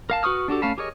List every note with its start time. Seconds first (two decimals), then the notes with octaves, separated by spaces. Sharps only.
0.10 A#4 F5 A5
0.23 F#4 B4 C#6 D#6 F6
0.48 D4 F#4 G4 A4
0.62 A3 C#4 F5 A5 B5
0.78 G4 G#4 A#4 C#5 D#5